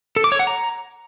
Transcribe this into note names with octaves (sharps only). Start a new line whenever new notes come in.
A4
D6
C#5
F#5
A#5